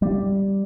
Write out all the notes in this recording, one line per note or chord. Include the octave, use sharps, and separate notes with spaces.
G3